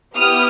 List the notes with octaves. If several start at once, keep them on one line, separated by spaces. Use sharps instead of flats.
B3 E4 G4 D#6 F6